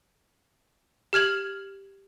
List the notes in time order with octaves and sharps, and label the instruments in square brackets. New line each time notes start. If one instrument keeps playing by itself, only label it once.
[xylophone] G4 F6 G#6 F#7